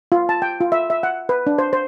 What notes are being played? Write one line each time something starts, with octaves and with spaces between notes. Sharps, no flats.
F4
A5
G5
F4
E5
E5
F#5
B4
D4
C5
C5